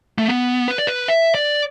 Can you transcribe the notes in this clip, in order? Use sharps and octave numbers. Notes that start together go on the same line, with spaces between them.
A3
B3
B4
D5
B4
E5
D5